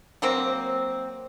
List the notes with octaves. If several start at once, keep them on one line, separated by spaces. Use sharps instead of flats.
F#3 A#3 C4